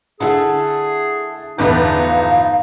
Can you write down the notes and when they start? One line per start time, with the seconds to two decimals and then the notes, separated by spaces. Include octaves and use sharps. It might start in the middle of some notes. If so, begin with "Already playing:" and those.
0.20 D3 A3 E4 G#4
1.58 G1 E2 A2 F3 A3 D#4 B4 F5